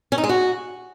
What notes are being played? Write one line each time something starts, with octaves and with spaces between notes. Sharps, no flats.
C#4
D#4
G#3
F#4